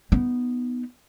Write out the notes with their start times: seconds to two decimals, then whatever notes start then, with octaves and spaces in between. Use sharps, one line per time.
0.12 B3 D#4